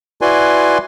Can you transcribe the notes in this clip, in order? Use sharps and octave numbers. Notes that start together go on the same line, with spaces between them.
E4 F#4 B4 D5 G#5 C6